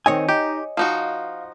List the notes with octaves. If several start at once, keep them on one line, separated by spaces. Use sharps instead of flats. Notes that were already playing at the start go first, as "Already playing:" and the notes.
D#3 C4 C#5 D#5 G#5
D#4 G4
F3 D#4 F#4 F5